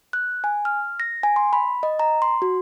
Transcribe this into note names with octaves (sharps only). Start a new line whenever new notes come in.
F#6
G#5
F6
A#6
G#5
C6
B5
D#5
A#5
C6
F#4